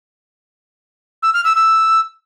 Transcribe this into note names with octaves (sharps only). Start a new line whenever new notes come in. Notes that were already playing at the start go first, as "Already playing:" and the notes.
E6
F6
E6
E6